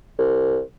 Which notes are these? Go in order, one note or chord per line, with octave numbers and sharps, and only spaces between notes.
C2